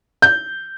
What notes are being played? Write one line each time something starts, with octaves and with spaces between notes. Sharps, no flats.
G6